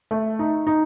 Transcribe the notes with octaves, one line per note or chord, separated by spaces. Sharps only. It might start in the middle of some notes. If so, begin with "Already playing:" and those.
A3
D#4
D#4